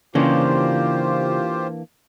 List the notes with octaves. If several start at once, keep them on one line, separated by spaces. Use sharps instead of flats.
C#3 E3 A#3 D4 F4 G4 C5